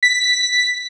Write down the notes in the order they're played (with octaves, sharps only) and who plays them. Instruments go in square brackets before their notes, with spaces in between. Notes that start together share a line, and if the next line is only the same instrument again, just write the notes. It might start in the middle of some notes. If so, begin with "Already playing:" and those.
[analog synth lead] B6